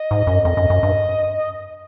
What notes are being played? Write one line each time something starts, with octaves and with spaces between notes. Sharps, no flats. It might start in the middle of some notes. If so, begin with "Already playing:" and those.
Already playing: D#5
G#2
F#2
F2 D#5
F#2
F#2
G2